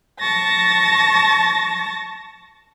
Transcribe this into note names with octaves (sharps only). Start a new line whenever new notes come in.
A5 C#6 A6 A#6